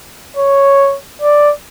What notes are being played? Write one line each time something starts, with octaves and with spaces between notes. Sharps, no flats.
C#5
D5